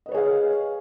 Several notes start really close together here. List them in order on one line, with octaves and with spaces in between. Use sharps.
D#5 B4 C#5 G#4 F5